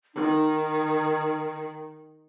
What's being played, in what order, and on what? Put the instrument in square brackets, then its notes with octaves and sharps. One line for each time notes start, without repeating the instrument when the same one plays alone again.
[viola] D#3 [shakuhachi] D#4